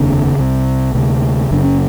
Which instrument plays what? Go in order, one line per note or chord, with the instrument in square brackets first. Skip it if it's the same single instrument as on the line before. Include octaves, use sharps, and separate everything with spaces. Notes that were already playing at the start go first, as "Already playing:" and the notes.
Already playing: [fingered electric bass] F1 D#2 C#3 C4 D4
C2 C3
D2 C3
F#1 F#2 C#3 D4
C#4